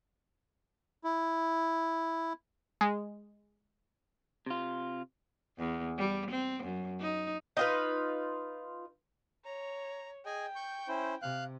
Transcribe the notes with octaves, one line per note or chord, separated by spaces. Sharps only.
E4
G#3
C3 F4
E2
G3
C4
F#2
D#4
D#4 F4 B4
C#5 A#5
G#4 D#5 G5 G#5
C#6 G6
C#4 E4 C5
C3 F5 F#6